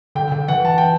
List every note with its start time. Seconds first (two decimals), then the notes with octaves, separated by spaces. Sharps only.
0.15 D3 G5
0.32 D3
0.48 E3 F#5
0.65 A5
0.78 G5